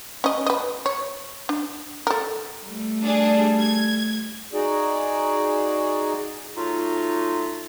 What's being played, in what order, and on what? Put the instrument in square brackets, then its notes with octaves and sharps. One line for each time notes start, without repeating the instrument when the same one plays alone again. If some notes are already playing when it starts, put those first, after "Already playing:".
[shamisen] C#4 D#5
B4 D#5
C#5
D4
A4 A#4
[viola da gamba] G3 A3
[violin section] D4 G#4
G#6
[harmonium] D#4 F#4 G#4 D5
[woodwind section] F#3 A3 D#4 F4